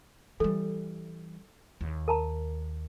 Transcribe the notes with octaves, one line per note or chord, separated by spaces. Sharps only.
E3 G3 A4
D#2
A#4 A5 A#5